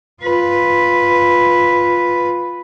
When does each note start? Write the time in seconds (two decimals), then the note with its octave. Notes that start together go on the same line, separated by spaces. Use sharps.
0.22 F4 B4